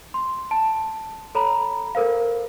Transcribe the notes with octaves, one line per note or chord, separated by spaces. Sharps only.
C6
A5
A4 C#5 A#5 B5
A4 A#4 C5 F5